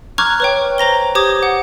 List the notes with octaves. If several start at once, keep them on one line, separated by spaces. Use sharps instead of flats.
A#5 C#6 D6 F6 F#6 G#6
B4 C#5 G5
C5 A#5 A#6 G7
G4 C5 D6 D#6 G6 G#6
F#5